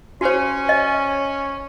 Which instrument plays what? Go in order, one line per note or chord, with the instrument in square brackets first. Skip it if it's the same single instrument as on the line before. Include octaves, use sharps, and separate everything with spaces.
[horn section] C#4 [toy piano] F#4 C5
[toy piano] D#5